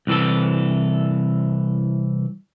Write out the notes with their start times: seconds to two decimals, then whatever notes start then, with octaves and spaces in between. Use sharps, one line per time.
0.07 C2 E3 A4